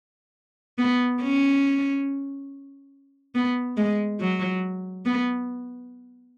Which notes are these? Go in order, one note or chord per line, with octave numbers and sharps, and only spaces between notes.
B3
C#4
B3
G#3
F#3
B3